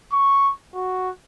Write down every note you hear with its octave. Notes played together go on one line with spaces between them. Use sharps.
C#6
F#4